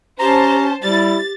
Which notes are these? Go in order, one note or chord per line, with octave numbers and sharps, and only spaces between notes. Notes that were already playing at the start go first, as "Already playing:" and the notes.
C#4 G4 C5 A5 A#5
G3 E4 G4 A6